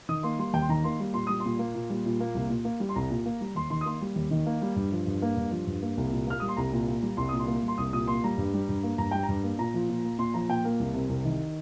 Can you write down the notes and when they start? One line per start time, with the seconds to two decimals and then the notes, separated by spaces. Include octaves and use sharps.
0.09 D#3 D#6
0.23 A#3 C6
0.39 G3 C6
0.53 D#2 G5
0.62 C6
0.69 D#3 A#5
0.84 A#3 C6
1.00 G3
1.14 A#2 C6
1.27 G3 D#6
1.40 C6
1.45 A#2
1.59 A#3
1.75 A#2
1.90 G3
2.05 A#2
2.20 A#3
2.35 C2
2.50 A#2
2.65 A#3
2.80 G3
2.89 C6
2.96 C2 A#5
3.11 A#2
3.26 A#3
3.41 G3
3.55 D#2 C6
3.70 D#3 C6
3.81 D#6
3.85 A#3 C6
4.02 G3
4.16 D#2
4.31 D#3
4.46 A#3
4.62 G3
4.76 G2
4.92 F3
5.07 G2
5.22 A#3
5.37 G2
5.51 F3
5.67 G2
5.82 A#3
5.97 C2
6.12 A#2
6.27 A#3 F6
6.40 G3 D#6
6.48 C6
6.57 C2 A#5
6.73 A#2
6.88 A#3
7.03 G3
7.17 C2 C6
7.29 A#2 D#6
7.39 C6
7.48 A#3
7.63 G3
7.68 C6
7.78 C2 D#6
7.93 A#2 D#6
8.07 A#3 C6
8.24 G3 A#5
8.38 G2
8.54 G3
8.69 G2
8.83 A#3
8.98 G2 A#5
9.11 G3 G5
9.23 A#5
9.29 G2
9.43 A#3
9.59 A#2 A#5
9.74 F3
9.89 A#2
10.05 A#3
10.19 A#2 C6
10.34 F3 A#5
10.49 A#2 G5
10.64 A#3 A#4
10.79 C2
10.94 C3
11.09 C2
11.25 D#3